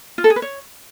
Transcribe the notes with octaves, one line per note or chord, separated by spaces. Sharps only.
F4
A4
G#4
B4
C#5